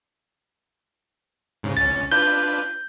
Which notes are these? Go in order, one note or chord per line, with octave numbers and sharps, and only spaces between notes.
G#2 C#3
C#2 C#4 A6
D4 F4 B4 G6